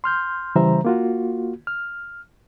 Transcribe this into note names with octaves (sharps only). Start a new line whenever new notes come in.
C6 F6 G6
C#3 E3 G3 C5 E5 A#5
A#3 F4 F#4
F6